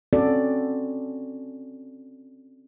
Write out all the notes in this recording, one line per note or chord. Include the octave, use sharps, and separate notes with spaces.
C4 C#4 F#4 A4 D5